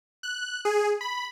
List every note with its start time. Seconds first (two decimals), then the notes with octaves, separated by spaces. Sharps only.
0.23 F#6
0.65 G#4
1.01 B5